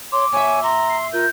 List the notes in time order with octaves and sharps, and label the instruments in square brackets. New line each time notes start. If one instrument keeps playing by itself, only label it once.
[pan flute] C#5 [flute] C6 [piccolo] D6
[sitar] A#2 E5 [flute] C#5 [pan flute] G#5
[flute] A#5 [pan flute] C6
[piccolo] C7
[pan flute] F4 [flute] A#4 [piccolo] G6